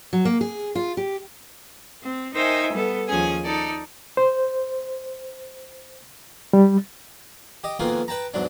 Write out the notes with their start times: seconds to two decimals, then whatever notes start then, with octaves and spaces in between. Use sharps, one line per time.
0.13 F#3
0.25 A#3
0.41 G#4
0.75 F4
0.97 G4
2.02 C4
2.33 D#4 A#4 C5 E5 G5 G#5
2.72 G3 B3 A4
3.08 D#2 F3 C#4 G#4 G#5
3.44 D#4 A4 D5
4.17 C5
6.53 G3
7.64 G4 D#5
7.79 F2 B2 D#3 G#3 A#3 F4
8.08 B4 G5 A5 A#5
8.34 E2 G#2 F#3 D4